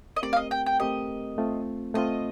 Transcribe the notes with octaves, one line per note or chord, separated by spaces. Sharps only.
D#5
A3 C4 G4 A#4 D5
F5
D#5
G5
G5
A3 C4 G4 A#4 D#5
A3 C4 F4
A3 C4 F4 D#5